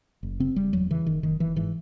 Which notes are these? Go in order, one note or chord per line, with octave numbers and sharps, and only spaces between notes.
F#1
C#3 C4
F#1 G3
E2 F#3
C#3 E3
F#1 D#3
F#1 D#3
F#1 E3
G#2 E3